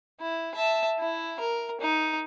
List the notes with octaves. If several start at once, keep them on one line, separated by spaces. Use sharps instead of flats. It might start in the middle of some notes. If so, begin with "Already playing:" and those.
E4
E5 A5
E4
A#4
D#4